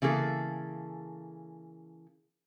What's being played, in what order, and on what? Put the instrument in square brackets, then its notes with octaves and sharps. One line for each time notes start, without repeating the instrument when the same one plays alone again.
[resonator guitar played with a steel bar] C#3 E3 A#3 G#4 A4